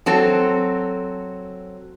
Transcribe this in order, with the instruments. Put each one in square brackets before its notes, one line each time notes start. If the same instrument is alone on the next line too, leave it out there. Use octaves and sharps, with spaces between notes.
[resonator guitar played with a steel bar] F#3 C4 A4